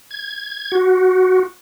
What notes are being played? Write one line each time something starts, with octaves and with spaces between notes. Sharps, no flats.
G#6
F#4